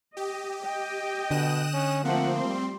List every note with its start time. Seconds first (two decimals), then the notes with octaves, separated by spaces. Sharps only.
0.17 G4 D#5
0.64 D#5 G5
1.31 B2 D3 D#6 F#6 E7
1.74 C#4
2.05 F3 A3 A#3 C4 F#5
2.40 G3 C6